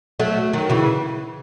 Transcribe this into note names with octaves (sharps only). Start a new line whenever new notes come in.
F#3 A3
D#3 F#3
C#3 E3